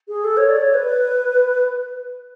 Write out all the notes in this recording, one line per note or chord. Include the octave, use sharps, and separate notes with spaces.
G#4
A4
C#5
D5
C#5
B4